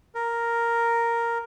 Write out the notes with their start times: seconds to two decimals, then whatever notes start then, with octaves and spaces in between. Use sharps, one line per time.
0.15 A#4